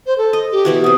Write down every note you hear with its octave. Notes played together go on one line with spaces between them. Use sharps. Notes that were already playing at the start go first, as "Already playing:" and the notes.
C5
A4
D#5
G4
B2 E3 F#4
C3 F#4 D#6